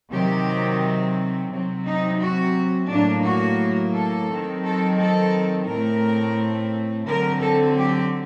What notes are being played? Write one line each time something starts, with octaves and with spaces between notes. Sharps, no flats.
C3 D#3 F#3 C4 G4
C3 F#3 C4
D#4
F#4
A2 F#3 A#3 D4
F#4
A4
D#3 F#3 C4
A4
A4
A2 A3 C4 A#4
D3 F#3 C4 A#4
A4
G4